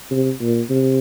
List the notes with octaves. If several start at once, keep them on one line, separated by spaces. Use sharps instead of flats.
C3
A#2
C3